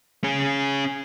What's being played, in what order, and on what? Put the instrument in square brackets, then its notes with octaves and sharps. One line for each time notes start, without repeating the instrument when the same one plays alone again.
[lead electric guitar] C#4 G#4